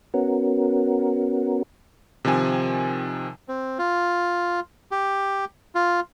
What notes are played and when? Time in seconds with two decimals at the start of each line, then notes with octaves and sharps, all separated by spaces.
0.14 B3 C#4 F#4 A#4
2.25 C3 D#3 F3 C4 G#5
3.48 C4
3.79 F4
4.91 G4
5.75 F4